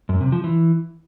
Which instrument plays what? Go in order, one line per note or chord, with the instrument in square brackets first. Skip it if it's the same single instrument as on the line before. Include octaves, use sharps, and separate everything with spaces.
[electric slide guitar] F#2
C3
F3
E3